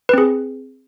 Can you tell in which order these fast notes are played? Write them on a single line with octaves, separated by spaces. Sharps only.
B4 C4 G#4